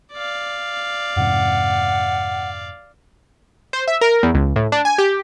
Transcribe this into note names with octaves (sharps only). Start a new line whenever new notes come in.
D5 F5
F2 G#2 C3 F#5
C5
E5
A#4
E2
C#2
A2
D4
G#5
G4